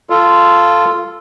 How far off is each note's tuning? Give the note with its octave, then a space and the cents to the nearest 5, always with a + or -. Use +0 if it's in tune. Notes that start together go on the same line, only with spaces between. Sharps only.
F4 -10 A4 +0